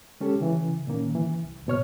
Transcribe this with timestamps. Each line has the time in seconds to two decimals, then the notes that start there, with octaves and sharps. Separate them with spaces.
0.21 G#3 C#4 G4 A4
0.41 C#3 E3
0.87 A#2 D#3 A#3 C#4
1.15 E3
1.44 C2
1.67 G#2 B2 C#5 F6